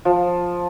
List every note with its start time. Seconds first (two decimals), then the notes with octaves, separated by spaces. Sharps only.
0.05 F3